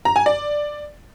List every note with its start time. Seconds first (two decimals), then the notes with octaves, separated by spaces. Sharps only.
0.05 A#5
0.16 G#5
0.26 D5